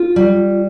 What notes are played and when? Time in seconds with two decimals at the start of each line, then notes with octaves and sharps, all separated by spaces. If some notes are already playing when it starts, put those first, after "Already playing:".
Already playing: F4
0.16 G3